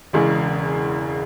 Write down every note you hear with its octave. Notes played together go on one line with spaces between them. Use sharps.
E1 E2 C#3 G#3